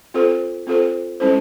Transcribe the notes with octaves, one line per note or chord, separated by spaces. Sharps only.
C4 F4 A4 C5
C4 F4 A4 C5
G#3 C#4 E4 A4 C5